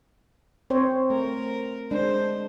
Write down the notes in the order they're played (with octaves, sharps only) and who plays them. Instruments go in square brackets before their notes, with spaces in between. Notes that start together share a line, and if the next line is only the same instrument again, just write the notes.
[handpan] C4 C5 C#5
[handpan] A3 [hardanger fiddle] A#4
[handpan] G#3 D4 [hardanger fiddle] C5